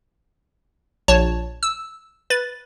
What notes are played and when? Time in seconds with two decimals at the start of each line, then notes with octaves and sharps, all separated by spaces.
1.08 A#1 C#5 A5
1.63 E6
2.30 B4 A6